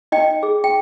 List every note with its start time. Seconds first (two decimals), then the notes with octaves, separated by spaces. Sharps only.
0.12 D#4 D#5 G5
0.43 G#4
0.64 G5